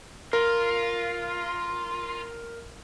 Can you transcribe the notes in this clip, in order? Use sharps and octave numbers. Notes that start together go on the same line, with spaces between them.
F4 A#4